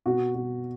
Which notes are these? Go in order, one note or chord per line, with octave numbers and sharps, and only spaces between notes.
B2 F#4
B2